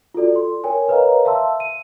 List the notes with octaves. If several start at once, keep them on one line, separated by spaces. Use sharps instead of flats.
F4 F#4 A4 D5
C6
A#4 C#5 G5 G#5
A#4 B4 C#5 D#5 F5 A#5
E5 F5 A5 C6 E6
D#7